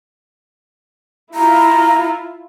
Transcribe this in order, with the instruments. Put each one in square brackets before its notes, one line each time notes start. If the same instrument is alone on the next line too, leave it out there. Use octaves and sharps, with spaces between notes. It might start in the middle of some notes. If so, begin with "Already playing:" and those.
[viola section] E4 F4 [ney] A#5